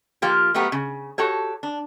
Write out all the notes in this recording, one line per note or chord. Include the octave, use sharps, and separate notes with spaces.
F3 A#3 F4 G4
F#3 A3 B3 G4 A#4
C#3
F#4 G4 A4 C#5
D4